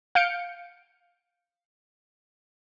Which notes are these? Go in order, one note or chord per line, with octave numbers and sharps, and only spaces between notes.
F5 G6 C#7 D7